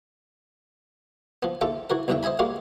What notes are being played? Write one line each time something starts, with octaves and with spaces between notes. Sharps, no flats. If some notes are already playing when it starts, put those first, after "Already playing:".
F3 B3
D#2 F4 A4 E5 G5
E3 F#4 A#4
B1 E2 G2 D3 E5 G5
C5 D#5 E5 G#5 B5
G3 G#3 A#3 F4 F#4